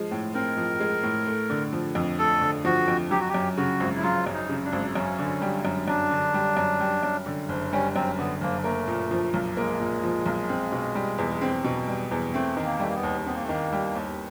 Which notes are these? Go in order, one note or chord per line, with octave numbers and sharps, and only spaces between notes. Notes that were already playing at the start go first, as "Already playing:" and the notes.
Already playing: F3 G#3
A2
C4 A#4
F3
G#3
A2
A3
D3
F3
F2
A3 A4
D3
F3 F#4
F2
F#3 G4
F#4
G4
F#2
C#3 F#4
G#1
E4
F#3 F4
F#2
D#4
C#3
D4
G#1
F#2 C#4
D3
G3
F#2
F#2 D4
D3
G3
F#2
G3
F#2
D3
F#1
G3 C#4
F#2 C4
D3 B3
F#1 A#3
A3 A#3
A#2
F3
B1
G#3 A#3
A#2
F3
B1
C4
B2
G3
E2
C4
B2
G3
E2
A3 C4
D#3
A#3
G3 A3
A#3
B3
D#2
B3 C4
A#3
A3
D#3 A#3
G3
D#2